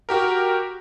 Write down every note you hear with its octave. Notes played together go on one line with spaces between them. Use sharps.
F#4 G4 A#4